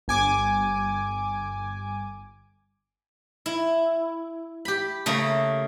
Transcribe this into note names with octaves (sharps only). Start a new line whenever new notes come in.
G1 G#5 D6
E4
G4 B5
C#3 A3 A#3